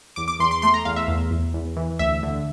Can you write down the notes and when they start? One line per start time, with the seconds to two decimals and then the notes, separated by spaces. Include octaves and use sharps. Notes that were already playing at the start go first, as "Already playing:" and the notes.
0.16 E2 D6
0.28 D6
0.39 E2 C6
0.51 C6
0.62 A3 C6
0.74 A#5
0.85 E2 F5
0.96 E5
1.08 E2
1.31 E2
1.54 E2
1.77 E3
1.99 D2 E5
2.23 D3